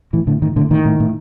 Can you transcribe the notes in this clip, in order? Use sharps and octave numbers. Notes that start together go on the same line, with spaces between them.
A2 E3
A2 D3
A2 D#3
A2 D3
A2 D#3
A2
A2